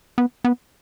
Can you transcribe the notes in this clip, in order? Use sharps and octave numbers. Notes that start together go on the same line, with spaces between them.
B3
B3